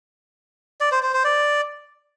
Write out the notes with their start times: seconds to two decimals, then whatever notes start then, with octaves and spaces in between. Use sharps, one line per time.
0.81 D5
0.92 C5
1.03 C5
1.13 C5
1.24 D5